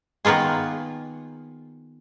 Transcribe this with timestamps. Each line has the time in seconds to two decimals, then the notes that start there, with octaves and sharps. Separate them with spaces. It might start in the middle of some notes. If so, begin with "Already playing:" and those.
0.25 D#3 A#3 B3 F4 G#4